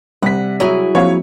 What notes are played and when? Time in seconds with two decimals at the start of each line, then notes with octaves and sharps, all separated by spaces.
0.22 C3 G3 F#5 B6
0.60 F#3 E4 G#4
0.95 F3 A#3 C4 C#5 F5